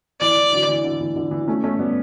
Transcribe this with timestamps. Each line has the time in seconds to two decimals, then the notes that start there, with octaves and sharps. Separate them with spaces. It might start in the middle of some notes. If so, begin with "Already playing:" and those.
0.20 E3 D5
0.37 E3
0.53 D3 F#3
0.69 E3
0.84 D3
1.01 E3
1.16 D3
1.31 E3
1.48 A3 C#4
1.64 A3 C#4
1.79 G3 B3